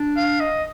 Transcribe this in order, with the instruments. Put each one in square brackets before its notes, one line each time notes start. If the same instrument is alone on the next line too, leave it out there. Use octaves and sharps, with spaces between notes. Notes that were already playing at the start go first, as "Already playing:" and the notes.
Already playing: [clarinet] D4
[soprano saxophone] F5
D#5